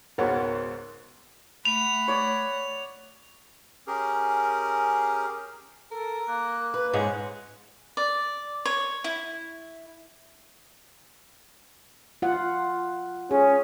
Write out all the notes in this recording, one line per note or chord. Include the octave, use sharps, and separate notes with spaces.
C#2 G#2 B2 A#4 C#5 F#5
A3 F#5 B5 F7
C#5 D5
C#4 G4 G#4 A#4
A4 A#4
A#3 F#6
B4
G#2 G#3 C#4 F#6
D5
C#5
E4
F4 F#5
C#4 G#4